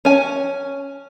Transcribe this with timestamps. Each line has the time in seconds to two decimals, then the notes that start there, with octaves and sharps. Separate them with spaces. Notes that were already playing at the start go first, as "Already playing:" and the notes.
0.05 C#4 G#5